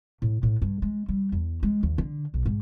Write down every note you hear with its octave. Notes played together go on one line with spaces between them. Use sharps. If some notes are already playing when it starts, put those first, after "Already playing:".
A2
A2
G2
G#3
G3
E2
G#3
D#2
D3
B1
G#2